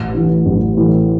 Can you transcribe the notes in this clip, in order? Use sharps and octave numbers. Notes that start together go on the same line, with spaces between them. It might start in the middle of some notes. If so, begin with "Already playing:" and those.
Already playing: A1
A2 E3
A1
A2 E3